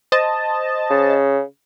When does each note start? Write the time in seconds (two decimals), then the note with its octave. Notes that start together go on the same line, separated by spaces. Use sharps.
0.12 C5 D#5 A5
0.90 C#3